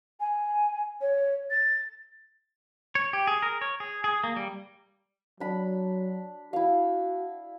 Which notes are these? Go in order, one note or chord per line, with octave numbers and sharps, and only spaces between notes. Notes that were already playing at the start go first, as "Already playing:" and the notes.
G#5
C#5
A6
C#5
G4
G#4
A#4
C#5
G#4
G#4
A#3
G3
F#3 D4 B5
E4 F#4 F5